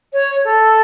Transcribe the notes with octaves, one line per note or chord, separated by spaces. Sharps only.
C#5
A4